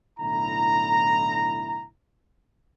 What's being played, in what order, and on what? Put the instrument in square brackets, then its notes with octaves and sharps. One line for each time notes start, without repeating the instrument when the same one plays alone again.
[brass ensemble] B1 A2 D3 E4 A#5